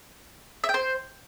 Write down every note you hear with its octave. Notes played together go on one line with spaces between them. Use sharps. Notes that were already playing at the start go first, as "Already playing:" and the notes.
E5
G5
C5